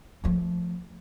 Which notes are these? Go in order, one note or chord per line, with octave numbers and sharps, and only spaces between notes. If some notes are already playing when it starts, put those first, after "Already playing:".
F3 A3